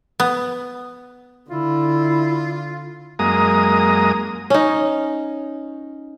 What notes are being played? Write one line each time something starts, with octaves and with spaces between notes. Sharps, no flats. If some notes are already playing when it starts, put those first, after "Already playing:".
B3
D3 E4 F4
F#2 G#3 A#3 A#5 D#6
C#4 D#4